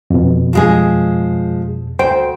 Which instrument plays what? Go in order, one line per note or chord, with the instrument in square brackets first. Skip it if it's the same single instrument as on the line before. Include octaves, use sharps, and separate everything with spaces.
[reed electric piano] F2 B2
[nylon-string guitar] F3 G#3 G#4
[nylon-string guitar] D2 G5 [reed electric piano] C5